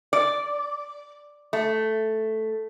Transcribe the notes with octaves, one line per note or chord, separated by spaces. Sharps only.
D5
A3